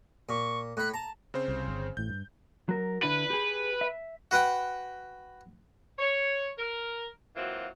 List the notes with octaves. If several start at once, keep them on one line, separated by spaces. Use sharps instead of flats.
A#2 C#6
A2 B5 F#6
A5 A#5
C#3 C4 C5
C2
G1
A1 A2 G6
G2
F#3 A#4
D3 D4 E4 B4
G4 G#4
E5
F#4 B4 F#5 G5
C#5
A#4
E3 F#3 A#3 C4 F4 F#4